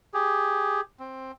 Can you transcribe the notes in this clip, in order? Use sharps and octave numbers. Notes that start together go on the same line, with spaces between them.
G4 G#4
C4